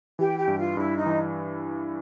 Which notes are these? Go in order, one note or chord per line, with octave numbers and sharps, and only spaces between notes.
E3 G4
G4
G2
F4
G2 E4
D#4
E3